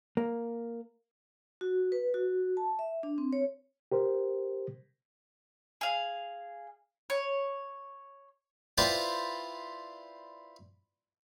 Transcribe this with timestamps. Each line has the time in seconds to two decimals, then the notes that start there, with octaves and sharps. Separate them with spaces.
0.17 A#3
1.61 F#4
1.92 B4
2.14 F#4
2.57 A5
2.79 E5
3.03 D4
3.18 C4
3.33 C#5
3.92 G4 A#4 C5
5.81 G#4 F5
7.10 C#5
8.78 E4 F4 B4 C5 D5 G5